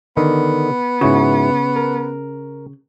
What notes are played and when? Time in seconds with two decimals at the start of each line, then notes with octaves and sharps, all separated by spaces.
0.17 D3 D#3 B3
1.01 G#2 C#3 E4 F#4
1.76 A#4